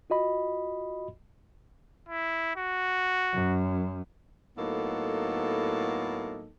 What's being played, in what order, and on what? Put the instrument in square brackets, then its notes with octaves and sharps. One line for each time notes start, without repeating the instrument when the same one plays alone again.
[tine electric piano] F4 F#4 D#5 B5
[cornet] E4
F#4
[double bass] F#2
[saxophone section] A2 F#3 A#3 B3 D#4 A4